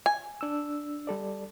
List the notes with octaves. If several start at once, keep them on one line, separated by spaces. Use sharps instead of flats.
G#5
D4 E6
G3 A4 D5